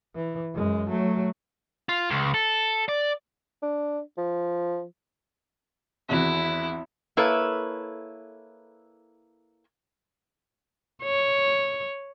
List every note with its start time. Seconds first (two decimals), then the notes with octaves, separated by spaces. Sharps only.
0.15 E3
0.53 F#2 G#3
0.89 F#3 A3
1.89 F4
2.10 C#2
2.34 A4
2.89 D5
3.62 D4
4.18 F3
6.09 G#1 E2 E4 F#4
7.17 A#3 E4 A4 B4 C#5 E5
11.03 C#5